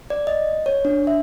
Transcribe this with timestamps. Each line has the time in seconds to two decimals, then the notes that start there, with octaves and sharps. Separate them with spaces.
0.10 D5
0.27 D#5
0.66 C#5
0.85 D4
1.07 E5